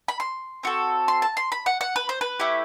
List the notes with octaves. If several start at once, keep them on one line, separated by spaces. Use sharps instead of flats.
B5
C6
C4 F#4 A4
C6
A5
C6
B5
F#5
F#5
B4
C5
B4
A3 E4 G4